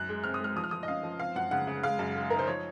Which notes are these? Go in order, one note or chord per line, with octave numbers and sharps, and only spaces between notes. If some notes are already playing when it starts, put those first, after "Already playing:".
Already playing: F#2 F#6
G#3
C4 F6
D#6
G#3 F6
F3 D#6
F6
F3 D#6
D#5
C#4 F5
F3
C4 F5
F#2 F#5
C#3 F#5
C#3
G#3 F5
F#2
G#3
D#4 A#4
C5
F3 C#5